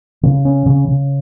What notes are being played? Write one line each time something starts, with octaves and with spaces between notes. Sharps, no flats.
C#3
C#4
C#3
C#3